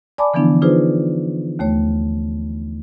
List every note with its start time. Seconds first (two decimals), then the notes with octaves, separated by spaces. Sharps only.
0.18 D5 G#5 A5 B5 D6
0.34 D3 E3 F3 B3 D4 E4
0.62 D4 D#4 F4 G#4 B4 C5
1.59 D#2 A3 C#5